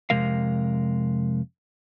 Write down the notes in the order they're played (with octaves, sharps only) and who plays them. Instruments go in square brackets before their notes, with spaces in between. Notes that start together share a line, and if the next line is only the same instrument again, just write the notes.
[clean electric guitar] F2 C3 G#3 A#4 F5